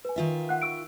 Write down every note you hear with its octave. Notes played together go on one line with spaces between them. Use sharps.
B4 G#5
D#3 F4 E5
F#5 F#6
C#6 E6 D7